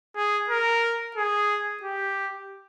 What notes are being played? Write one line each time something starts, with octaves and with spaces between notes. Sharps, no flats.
G#4
A#4
G#4
G4